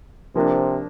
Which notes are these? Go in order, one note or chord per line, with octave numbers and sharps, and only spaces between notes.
C3 F3 A#3 D4